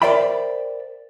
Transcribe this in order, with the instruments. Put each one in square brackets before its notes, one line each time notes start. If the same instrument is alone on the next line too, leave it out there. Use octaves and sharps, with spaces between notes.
[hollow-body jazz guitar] A#4 C5 D5 E5 G5 B5